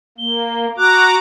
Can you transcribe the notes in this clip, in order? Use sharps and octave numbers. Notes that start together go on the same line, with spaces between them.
A#3 G7
F#4 A#5 D6 F#6